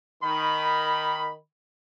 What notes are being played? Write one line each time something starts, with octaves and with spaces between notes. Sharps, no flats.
D#3 B5